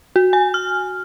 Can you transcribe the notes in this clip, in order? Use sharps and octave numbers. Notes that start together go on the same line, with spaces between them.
F#4
G#5
F6